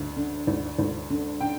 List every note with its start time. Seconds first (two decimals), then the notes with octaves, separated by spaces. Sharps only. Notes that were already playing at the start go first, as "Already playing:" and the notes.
Already playing: D2
0.17 D3
0.47 D2
0.79 D2
1.10 D3
1.40 D3 G5